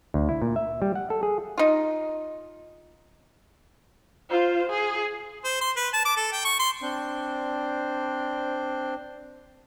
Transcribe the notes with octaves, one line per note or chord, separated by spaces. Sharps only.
D2
E4
A#2
E5
G3
F#5
A4
G#4
D#4 F4
F4 C5
G#4
C5
C6
B4
A5
D6
A4
G5
C#6
C6
C4 D4 C5